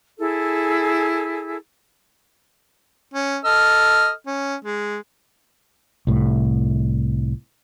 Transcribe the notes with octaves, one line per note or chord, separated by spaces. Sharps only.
E4 G#4 A4
C#4
A4 D#5 F6
C#4
G#3
C2 A2